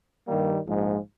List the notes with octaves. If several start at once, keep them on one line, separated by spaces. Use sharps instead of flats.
G2 D#3 G3 A#3
A#1 G#2 F3 G#3